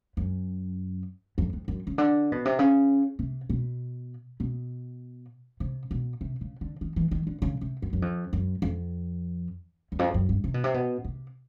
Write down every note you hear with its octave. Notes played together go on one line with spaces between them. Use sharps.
F#2
F2
F2
F#2
C#3
D3
B2
C3
C#3
C3
B2
B2
C3
B2
C3
C#3
D3
D#3
E3
D#3
D3
C#3
C3
F#2
F#2
F2
F#2
F2
E2
F2
F#2
G2
C3
B2
C3
B2
C3